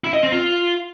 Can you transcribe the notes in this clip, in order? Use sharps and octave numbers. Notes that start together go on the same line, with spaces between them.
E4
D#5
C4
F4